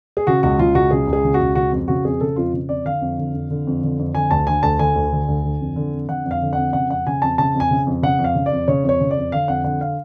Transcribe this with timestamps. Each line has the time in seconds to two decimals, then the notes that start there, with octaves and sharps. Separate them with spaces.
0.17 G#4
0.27 C#3 F#4
0.43 C#2 F#4
0.59 C#3 F4
0.75 C#2 F#4
0.91 C#3 G#4
1.07 C#2
1.13 G#4
1.24 C#3
1.34 F#4
1.40 C#2
1.55 C#3 F#4
1.72 F2
1.88 C#3 F#4
2.05 F2 G#4
2.21 C#3 A4
2.36 F2 F4
2.53 C#3
2.69 F2 D5
2.85 D3 F5
3.01 F2
3.18 D3
3.34 F2
3.50 D3
3.67 F2
3.83 D3
3.99 F2
4.15 D3 G#5
4.31 D2 A5
4.47 D3 G#5
4.63 D2 A5
4.79 D3 G#5
4.96 D2
5.12 D3
5.28 D2
5.44 D3
5.61 F2
5.76 D3
5.93 F2
6.08 D3 F#5
6.25 F2
6.31 F5
6.42 D3
6.53 F2 F#5
6.73 C#3 F#5
6.90 F2 F#5
7.07 C#3 G#5
7.22 F2 A5
7.38 C#3 A5
7.54 F2
7.60 G#5
7.71 C#3
7.87 F2
8.03 C#3 F#5
8.19 F2
8.24 F5
8.35 C#3
8.46 D5
8.52 F2
8.68 C#3 C#5
8.84 F2
8.89 C#5
9.01 C#3
9.11 D5
9.17 F2
9.32 D3 F5
9.48 F2 F#5
9.64 D3 F#5
9.81 F5